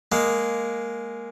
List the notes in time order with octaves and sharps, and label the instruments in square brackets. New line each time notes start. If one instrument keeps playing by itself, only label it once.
[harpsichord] G#3 A#3